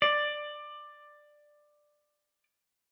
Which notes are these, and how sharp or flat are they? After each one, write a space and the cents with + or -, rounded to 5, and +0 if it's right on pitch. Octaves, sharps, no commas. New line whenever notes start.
D5 +15